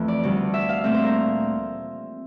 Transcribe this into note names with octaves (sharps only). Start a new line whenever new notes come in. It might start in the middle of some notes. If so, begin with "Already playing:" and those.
Already playing: F2 E3 A3
D5
D2 D3 G3
E5
F5
A#2 A3 C4 E5
C5
A#4